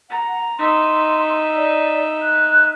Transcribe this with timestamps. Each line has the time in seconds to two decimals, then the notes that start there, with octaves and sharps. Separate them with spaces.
0.10 F#5 A#5
0.59 D#4 E5 C6
1.56 D5
2.22 F#6